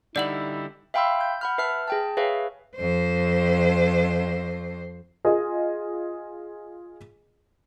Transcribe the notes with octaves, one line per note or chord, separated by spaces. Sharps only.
D3 G3 D#4 E4 D5 F#5 F#7
E5 F5 G5 B5 C6 E6
G6
F#5 B5 F6
B4 E5 A5 F6
G#4 G5 A5
G#4 B4 C#5 E5 F5
F2 C5
F4 G#4 D#5